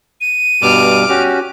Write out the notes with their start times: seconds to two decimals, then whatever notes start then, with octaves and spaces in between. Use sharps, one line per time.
0.21 D#7
0.62 G2 B2 G3 D6 F6
1.09 C#4 F#4 G4